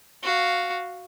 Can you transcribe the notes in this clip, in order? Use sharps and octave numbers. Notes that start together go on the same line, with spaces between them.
F#4 F5